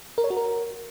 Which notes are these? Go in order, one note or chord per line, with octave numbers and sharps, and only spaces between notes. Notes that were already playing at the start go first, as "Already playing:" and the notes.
A#4
C#5
F#4
A#4